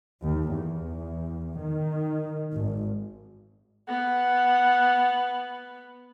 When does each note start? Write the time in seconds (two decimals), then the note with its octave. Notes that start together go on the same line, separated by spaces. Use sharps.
0.22 D#2
0.51 E2
1.60 D#3
2.52 G#1
3.88 B3 F#5